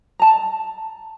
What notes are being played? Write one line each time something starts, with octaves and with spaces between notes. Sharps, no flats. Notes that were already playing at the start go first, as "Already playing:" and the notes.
A5 A#5